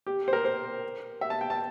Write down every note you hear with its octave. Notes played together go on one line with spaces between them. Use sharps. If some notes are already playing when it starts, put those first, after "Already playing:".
G4
C5
A#4
C5
E5
A5
G5
A5